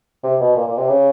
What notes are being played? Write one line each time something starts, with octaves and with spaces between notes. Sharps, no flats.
C3
B2
A#2
A#2
C3
C#3